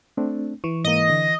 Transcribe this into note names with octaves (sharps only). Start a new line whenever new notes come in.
A3 C4 D4
E3 C#6
G#2 A#3 D#5
D3